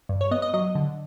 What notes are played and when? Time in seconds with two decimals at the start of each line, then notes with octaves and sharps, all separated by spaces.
0.09 G2
0.21 C#5
0.31 B3 D#5
0.42 D#5
0.53 F#3 D#5
0.75 D3